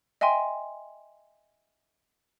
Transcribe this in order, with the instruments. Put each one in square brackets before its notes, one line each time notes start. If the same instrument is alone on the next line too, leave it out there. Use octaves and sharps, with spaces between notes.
[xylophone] D#5 E5 G5 G#5 C6